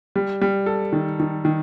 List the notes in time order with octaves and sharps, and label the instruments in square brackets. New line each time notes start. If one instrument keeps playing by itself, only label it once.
[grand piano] G3
G3
A4
D#3
D#3
D#3